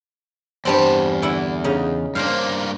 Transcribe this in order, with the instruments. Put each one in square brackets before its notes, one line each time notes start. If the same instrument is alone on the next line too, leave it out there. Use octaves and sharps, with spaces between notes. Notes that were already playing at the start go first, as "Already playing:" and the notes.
[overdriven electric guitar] E2 A5 [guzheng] G2 G3 C4
[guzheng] D3 E4
C#3 D#4
[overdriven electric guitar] G2 A#3 [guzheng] D4 C5 F5